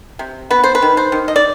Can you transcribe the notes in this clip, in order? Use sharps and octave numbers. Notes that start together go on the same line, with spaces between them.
C3
B3 B4
C5
B4
D#3
C5
D#3
D#5
D5